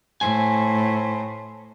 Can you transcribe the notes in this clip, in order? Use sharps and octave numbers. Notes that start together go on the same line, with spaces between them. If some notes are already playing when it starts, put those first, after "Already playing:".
A2 C5 G#5